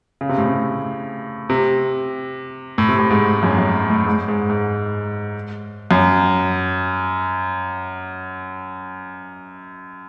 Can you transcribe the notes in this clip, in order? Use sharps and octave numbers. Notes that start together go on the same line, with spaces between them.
C#3
C3
A2
C3
C3
A2
C3
A2
G#2
F#2
F#2
A2
G#2
G#2
G#2
F#2